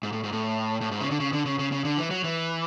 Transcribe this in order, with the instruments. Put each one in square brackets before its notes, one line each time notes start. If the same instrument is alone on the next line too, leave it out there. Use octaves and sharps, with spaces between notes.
[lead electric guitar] G#2
A2
G#2
A2
A2
G#2
C#3
D3
C#3
D3
C#3
C#3
C#3
D3
E3
F#3
E3